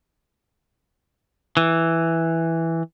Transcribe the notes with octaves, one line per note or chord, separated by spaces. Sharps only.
E3